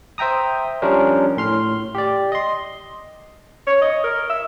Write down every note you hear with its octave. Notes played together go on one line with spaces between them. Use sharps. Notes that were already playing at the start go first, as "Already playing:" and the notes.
C5 E5 G5 A#5 D#6
F3 G3 C#4 D4 A#4 C5
A2 C6 F6
G4 D5
D#5 C6
C#5
D#5
A#4
E5